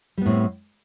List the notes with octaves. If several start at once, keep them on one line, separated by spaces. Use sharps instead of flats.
A2 G3 B3 C4